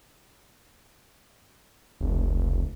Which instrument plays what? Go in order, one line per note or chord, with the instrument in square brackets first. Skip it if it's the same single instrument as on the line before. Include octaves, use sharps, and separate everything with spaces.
[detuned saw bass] F1 [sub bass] C#2